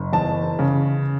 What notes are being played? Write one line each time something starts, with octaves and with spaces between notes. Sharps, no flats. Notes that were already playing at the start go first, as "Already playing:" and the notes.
Already playing: F#1
E2 A5
C#3